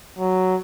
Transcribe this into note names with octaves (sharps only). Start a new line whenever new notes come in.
F#3